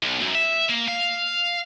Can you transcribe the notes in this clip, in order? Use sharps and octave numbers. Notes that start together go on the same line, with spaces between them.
B1
F#2
E5
A#3
F5